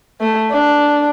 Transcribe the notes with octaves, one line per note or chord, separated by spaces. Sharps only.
A3
D4